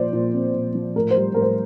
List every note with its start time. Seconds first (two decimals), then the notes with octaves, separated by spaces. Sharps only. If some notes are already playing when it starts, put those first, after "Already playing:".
Already playing: A#2 F3 C5 D5
0.13 A#2
0.33 C4
0.54 A#2
0.75 F3
0.96 A2 A#4
1.10 C5
1.17 G3
1.34 A2 A#4
1.42 C5